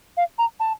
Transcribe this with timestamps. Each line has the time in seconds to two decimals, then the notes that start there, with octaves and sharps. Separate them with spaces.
0.17 F5
0.38 A#5
0.60 A5